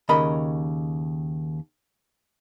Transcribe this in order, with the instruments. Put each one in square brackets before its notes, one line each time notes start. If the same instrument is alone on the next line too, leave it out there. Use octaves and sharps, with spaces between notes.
[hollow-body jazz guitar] D#2 C#3 A#4 D#5 B5